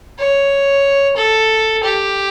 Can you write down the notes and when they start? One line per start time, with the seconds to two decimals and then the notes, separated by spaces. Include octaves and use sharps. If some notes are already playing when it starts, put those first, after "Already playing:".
0.18 C#5
1.17 A4
1.84 G4